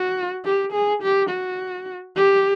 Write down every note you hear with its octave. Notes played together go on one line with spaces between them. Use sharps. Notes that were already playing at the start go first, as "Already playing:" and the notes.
Already playing: F#4
G4
G#4
G4
F#4
G4